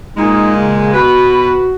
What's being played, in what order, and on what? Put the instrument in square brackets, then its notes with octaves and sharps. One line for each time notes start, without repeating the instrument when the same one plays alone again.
[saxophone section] A#2 G#3 [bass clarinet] D#4
[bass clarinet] C#3
[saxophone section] B2 B4 [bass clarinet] F#4